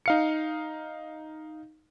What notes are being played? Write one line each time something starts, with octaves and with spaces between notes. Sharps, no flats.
D#4 F5 C#7